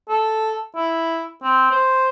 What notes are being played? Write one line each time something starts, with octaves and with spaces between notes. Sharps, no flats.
A4
E4
C4
C5